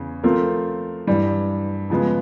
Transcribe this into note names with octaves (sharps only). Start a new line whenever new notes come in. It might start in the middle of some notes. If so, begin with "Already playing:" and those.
Already playing: E2 C#3
F3 A3 C4 F4 A#4
G2 E3 G3
C#3 F3 G#3 B3